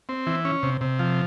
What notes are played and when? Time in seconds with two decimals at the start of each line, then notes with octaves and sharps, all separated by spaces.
0.09 C4
0.27 E3
0.45 C#4
0.63 C3
0.81 C3
0.99 F3